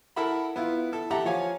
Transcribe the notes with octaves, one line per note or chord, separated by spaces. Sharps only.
E4 A4 A#4 E5 F#5 B5
B3 E4 F4
E4 A4
G4 A4 E5 F#5 A5 A#5
F3 C#5 F5 G#5